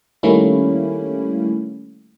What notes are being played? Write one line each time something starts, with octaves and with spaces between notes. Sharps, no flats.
D#3 G3 A3 A#3 C#4 E4